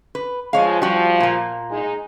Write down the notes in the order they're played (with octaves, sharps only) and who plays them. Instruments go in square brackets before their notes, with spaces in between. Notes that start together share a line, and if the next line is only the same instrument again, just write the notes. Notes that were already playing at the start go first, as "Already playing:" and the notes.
[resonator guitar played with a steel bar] B4
[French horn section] F3 G#3 [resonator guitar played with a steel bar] C#5 F5
[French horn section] F3 [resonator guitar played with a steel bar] G3 F#4
[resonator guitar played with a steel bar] A#2 A#3
[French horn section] G#3 D#4